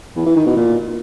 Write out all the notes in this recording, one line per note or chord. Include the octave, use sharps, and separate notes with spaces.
E2
E3
D#3
B2
A#2